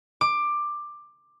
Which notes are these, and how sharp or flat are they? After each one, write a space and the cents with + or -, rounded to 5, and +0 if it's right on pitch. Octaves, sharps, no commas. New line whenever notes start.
D6 +15